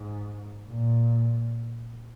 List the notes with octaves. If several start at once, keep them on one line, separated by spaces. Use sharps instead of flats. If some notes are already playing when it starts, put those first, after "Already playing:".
Already playing: G#2
A#2